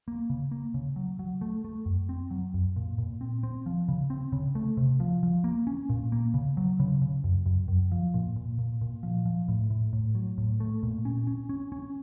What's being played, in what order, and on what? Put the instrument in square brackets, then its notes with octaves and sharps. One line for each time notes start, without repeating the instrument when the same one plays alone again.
[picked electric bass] A#3
C#3
A#3
C#3
F#3
F#3
A3
A3
F#2
C4
F#3
F#2
A#2
A#2
C4
C4
F3
C#3
C4
C#3
A3
C3
F3
F3
A#3
C#4
A#2
A#3
C#3
F#3
C#3
C#3
F#2
F#2
F#2
F3
A#2
A#2
A#2
A#2
F3
F3
A2
A2
A2
F#3
A2
A3
A#2
C#4
C#4
C#4
C#4